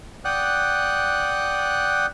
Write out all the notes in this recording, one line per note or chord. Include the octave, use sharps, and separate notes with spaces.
D5 F#5 G5 D#6 F#6